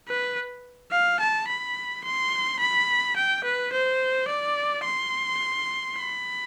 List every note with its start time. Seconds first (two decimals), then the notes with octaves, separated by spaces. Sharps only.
0.08 B4
0.92 F5
1.20 A5
1.47 B5
2.04 C6
2.60 B5
3.16 G5
3.44 B4
3.73 C5
4.28 D5
4.84 C6
5.96 B5